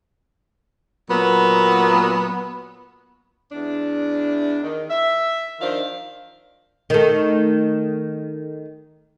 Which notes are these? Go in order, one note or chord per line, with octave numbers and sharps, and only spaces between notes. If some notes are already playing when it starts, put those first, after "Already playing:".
A#2 F#3 B3
E2 D4
D#3
E5
D#3 F3 D4 C5 F5
D#3 A3